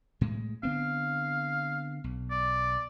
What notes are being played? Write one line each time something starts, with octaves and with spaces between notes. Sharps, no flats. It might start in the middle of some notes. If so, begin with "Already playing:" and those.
A2 G#3
D3 B3 C4 F5
B1
D5